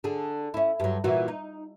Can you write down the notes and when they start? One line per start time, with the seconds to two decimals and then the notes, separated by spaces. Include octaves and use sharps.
0.04 D3 G#4
0.54 C#4 E4
0.80 G2 F#3
1.04 A#2 E3 F#4
1.28 D#4